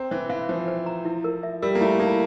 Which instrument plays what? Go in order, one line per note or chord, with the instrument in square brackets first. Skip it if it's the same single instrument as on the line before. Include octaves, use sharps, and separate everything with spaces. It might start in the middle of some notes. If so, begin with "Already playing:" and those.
Already playing: [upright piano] C4 [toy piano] A#5
[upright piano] E3 [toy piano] C5
[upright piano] E3 [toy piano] F5
[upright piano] F3 [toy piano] C5
[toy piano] C5
A#5
E4
A#4
E5
[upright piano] G3 [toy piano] A#4
[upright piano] A#3
[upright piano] A3 [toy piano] E4
[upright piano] A#3 [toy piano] E4